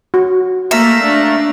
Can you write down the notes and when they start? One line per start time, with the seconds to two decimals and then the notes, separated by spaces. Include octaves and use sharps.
0.14 F#4
0.71 A3 A#3 E5 F5 A#5
1.03 D4